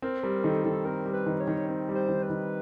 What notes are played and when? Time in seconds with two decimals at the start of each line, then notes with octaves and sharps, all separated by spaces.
0.02 C4 A#4
0.23 G3 A#4
0.44 D#3 A4
0.65 D#3 A4
0.85 C4 A#4
1.06 G3
1.13 B4
1.26 D#3
1.40 C#5
1.47 D#3
1.68 C4
1.89 G3
1.95 C5
2.09 D#3
2.23 B4
2.30 D#3